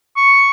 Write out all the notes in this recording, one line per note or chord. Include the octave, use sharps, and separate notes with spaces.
C#6